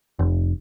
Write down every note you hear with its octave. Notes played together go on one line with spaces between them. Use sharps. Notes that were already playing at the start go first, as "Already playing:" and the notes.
F1